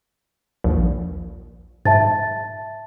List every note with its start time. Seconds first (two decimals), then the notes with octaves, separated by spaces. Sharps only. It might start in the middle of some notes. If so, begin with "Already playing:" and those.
0.64 A#1 D#2
1.85 G#2 E5 A5 A6